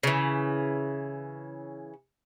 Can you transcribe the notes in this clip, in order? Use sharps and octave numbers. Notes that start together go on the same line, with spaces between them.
C#3 E3